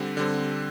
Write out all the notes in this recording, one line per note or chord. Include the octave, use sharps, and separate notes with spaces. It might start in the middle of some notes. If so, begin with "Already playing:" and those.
Already playing: D3 G3 C4
D3 G3 C4